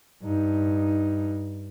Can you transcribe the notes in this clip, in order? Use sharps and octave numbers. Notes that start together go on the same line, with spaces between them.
G2 D#4